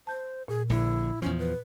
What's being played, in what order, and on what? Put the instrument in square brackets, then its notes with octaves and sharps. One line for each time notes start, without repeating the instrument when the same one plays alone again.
[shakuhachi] C5 [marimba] A5 G6
[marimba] A#2 [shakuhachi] G#4
[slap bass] A#1 D3 [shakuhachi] E4
[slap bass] E2 F3 [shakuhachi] C#4
[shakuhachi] B4